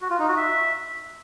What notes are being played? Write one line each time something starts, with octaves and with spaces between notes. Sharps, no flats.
F#4
F4
D#4
F#4
E5